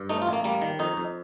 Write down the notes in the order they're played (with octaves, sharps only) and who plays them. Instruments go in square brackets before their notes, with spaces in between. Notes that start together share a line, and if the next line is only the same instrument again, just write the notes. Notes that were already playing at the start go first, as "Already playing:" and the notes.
Already playing: [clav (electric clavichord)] G2
A3 D#4
F4
A1
A#3
G3 A#3
D#3
F2 D#4
F2